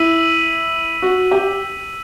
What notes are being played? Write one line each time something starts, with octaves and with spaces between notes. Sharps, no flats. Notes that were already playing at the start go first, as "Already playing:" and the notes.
Already playing: E4 E6 B6 D#7 F#7
F#4
G4